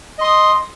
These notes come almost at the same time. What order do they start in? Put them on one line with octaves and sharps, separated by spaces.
D#5 C6 D#6